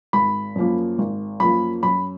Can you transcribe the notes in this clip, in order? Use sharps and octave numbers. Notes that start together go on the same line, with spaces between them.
G#1 B5
F#2 F3 A#3
G#1
F#2 F3 A#3 B5
F#2 B5